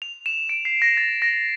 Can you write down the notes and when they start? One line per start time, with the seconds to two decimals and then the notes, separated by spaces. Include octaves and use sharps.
0.02 F7
0.26 E7
0.49 D7
0.65 C7
0.82 A#6
0.97 A6
1.22 A#6